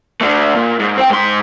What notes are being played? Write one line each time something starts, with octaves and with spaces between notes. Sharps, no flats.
A3 D4
A#2
G#2
C4 G5
G#2 C6